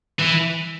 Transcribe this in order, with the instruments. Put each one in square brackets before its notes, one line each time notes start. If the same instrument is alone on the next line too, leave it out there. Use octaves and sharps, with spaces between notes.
[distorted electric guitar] E3